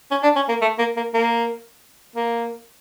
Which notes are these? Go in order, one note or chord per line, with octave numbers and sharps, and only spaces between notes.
C#4
D4
C#4
A#3
A3
A#3
A#3
A#3
A#3